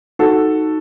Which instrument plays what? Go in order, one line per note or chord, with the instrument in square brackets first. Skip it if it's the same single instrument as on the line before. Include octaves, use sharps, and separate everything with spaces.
[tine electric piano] D#4 [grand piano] F#4 A4